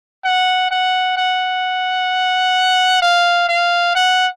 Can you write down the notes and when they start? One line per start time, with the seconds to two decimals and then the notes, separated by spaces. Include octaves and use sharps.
0.24 F#5
0.71 F#5
1.17 F#5
3.02 F5
3.49 F5
3.95 F#5